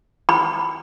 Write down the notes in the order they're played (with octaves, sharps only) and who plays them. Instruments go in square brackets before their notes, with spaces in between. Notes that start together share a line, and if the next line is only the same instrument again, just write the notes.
[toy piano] B5